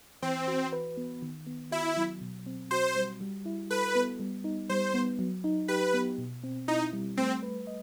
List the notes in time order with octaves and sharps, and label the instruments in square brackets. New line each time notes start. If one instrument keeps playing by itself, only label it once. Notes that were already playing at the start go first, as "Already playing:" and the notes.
[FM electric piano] E3 [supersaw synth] C4
[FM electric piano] F#4
B4
B3
D#3
B3
[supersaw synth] E4 [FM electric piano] F#4
[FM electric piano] F#3
B2
C4
[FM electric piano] F#4 [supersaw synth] C5
[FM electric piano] G3
G3
E4
[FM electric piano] A4 [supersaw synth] B4
[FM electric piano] B3
G3
D#4
[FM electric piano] G3 [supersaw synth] C5
[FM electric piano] B3
F#3
D#4
[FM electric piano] G4 [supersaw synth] B4
[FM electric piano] B3
B2
C4
[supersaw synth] D#4 [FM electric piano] E4
[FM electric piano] G3
[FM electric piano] A3 [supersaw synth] C4
[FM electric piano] B4
D#5